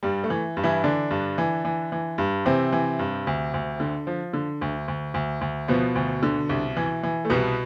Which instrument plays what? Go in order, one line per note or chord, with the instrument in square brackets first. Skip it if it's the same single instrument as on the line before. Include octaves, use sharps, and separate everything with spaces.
[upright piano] G2 G3
A3
E3
G2
E3 E4
D3 E3 D4
G2
E3
E3
E3
G2
C3 E3 C4
E3
G2
D2
D2
D3
F3
D3
D2
D2
D2
D2
B2 F3 B3
D2
D3
C2
E3
E3
A3
C2 B2 B3